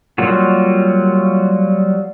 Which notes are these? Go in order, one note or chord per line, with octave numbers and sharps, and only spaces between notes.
F#3 G3 A#3 F4 F#4